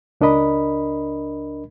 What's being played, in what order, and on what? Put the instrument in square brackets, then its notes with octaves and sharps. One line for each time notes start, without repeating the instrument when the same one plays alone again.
[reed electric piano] C#2 D4 A#4 D#5 B5